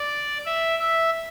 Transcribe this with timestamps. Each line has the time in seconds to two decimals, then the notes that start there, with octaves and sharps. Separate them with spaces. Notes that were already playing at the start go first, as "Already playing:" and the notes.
Already playing: D5
0.46 E5
0.79 E5